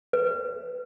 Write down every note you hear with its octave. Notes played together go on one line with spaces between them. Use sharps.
B4